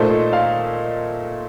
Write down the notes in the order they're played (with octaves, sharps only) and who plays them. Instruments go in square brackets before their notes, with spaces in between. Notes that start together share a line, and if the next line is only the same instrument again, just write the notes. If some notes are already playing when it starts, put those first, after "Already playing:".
Already playing: [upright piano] A#2 A3 D#4 A4 C5 [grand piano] D#5
[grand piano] F5